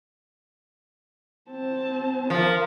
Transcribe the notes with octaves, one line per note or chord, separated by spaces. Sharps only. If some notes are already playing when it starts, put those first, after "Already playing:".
C4 A5
F3 A#4 F5